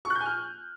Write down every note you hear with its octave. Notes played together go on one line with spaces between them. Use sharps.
C#6
F#6
G6
G#5
F6